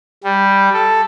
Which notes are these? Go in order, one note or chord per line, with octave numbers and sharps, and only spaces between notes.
G3
A4